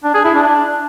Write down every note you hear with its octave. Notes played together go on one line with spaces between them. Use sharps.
D4
G#4
E4
D4